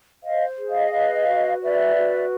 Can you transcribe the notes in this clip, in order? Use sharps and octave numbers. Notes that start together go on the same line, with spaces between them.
C5 D#5 F5
G#4
D#5 F5
B4
F#4
B4 D5 E5
F#4